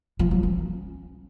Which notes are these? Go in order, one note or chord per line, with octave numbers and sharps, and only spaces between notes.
F3
F#3
C#4